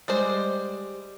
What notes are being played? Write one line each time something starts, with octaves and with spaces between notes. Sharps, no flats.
G3 G#3 C5